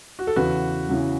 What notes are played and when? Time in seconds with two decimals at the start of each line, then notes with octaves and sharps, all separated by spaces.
0.19 F#4
0.27 A4
0.36 E2 C#3 E3 F#4 B4
0.89 E2 C#3 E3